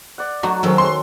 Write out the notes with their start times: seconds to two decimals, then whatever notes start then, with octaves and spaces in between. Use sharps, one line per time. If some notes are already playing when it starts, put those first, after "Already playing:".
0.18 D5 F#5
0.43 F#3 A3 D#4 F#4 C#6
0.63 D#3 F#3 G#3 C4 C#4 A4
0.78 C6